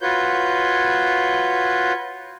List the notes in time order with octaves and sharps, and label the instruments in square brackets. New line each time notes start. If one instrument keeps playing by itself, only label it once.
[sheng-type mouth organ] F4 F#4 B4 C#5 G6